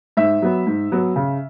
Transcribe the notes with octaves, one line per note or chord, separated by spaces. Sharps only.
G#2 E5
F#3 B3
G#2
F#3 B3
C#3